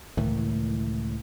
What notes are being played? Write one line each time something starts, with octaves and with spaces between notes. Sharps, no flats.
C#2 A2 D#3 E3